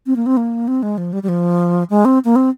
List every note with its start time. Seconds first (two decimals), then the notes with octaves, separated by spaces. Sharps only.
0.07 C4
0.16 A#3
0.26 C4
0.37 A#3
0.68 C4
0.83 G#3
0.98 F3
1.13 G3
1.23 G3
1.29 F3
1.90 G#3
2.05 C4
2.25 A#3
2.36 C4